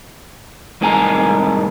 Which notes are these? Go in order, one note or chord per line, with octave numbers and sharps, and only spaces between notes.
C2 A2 D#3 G#3 G#5 A#5